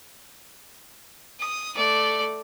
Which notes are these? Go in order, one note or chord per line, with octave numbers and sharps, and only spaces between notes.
D#6
A3 D5